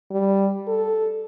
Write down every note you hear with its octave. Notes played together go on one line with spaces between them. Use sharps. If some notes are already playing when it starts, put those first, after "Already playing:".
G3
A4